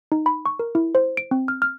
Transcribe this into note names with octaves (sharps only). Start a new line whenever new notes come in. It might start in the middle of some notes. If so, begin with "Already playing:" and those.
D#4
B5
C#6
A#4
E4
C5
D7
C4
F6
F6